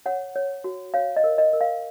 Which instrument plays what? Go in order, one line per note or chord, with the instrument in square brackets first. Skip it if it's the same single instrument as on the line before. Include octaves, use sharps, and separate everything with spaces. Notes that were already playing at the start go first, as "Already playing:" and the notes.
[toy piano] C#5 F#5
C#5
F#4
C#5 F5
D#5
A#4
D#5
A#4
F5